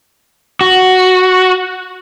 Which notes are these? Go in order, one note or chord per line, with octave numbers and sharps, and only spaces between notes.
F#4